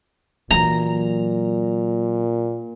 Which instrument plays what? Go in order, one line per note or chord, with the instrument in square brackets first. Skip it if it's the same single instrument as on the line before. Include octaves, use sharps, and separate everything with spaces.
[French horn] A#2 [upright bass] E3 F#3 [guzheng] A#5